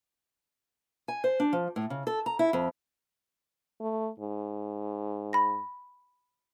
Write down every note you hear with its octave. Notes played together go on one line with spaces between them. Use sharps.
G#5
C5
D4
F3
A2
C#3
A4
A#5
E4
F2
A3
G#2
B5 A#6